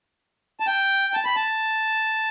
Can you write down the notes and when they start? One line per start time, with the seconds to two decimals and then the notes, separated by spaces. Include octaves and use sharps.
0.60 A5
0.67 G5
1.14 A5
1.25 B5
1.36 A5